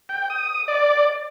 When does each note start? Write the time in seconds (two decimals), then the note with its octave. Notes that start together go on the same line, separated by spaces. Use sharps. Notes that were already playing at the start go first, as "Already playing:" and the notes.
0.09 G5
0.30 D#6
0.68 D5